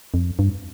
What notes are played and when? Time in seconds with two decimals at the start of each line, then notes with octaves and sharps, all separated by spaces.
0.14 F2
0.39 G2